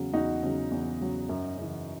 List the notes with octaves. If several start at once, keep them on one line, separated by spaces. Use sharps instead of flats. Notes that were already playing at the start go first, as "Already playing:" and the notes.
Already playing: E2 C#3 F#3
E2 D#4 F#4
C#3 F#3
E2
C#3 F#3
F#2
C#3 E3